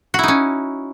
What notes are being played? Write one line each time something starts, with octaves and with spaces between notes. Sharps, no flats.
C#4 D#4 E4 F#4